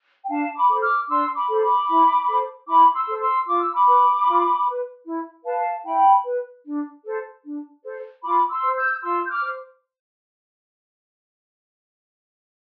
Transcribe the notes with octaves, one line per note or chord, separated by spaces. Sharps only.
G5
D4 F5 A5
B5 D6
A4 C5
D6 F6
D4 C6 E6
B5 D6
A4 C5
B5 D6
E4
A4 C5
E4 B5 D6
C6 E6
A4 C5
C6 E6
F4 D6
E6
B5 D6
B4
F4
B4
E4
B4 F5 A5
E4 G5 B5
B4
D4
A4 C5
D4
A4 C5
F4 B5 D6
C6 E6
C5
E6 G6
F4 C6 E6
G6
D6 F6
C5